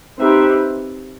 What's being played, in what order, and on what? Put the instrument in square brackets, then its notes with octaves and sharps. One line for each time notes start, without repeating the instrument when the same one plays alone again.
[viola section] C4 D#4 G4 B4 E5